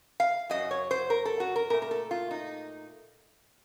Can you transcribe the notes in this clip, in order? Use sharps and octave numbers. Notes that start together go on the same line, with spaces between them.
F5
F#2 C#3 F#3 D#5
C#5
C5
A#4
A4
F#4
A#4
A#2 A3 A#4
A#4
A4
F4
D#4